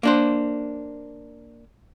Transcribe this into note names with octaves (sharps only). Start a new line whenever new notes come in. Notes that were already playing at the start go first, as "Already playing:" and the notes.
A#3 D4 C5